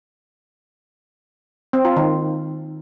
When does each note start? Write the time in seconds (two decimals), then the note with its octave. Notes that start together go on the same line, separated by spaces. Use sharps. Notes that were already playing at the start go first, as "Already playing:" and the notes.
1.73 C4
1.85 F4
1.96 D#3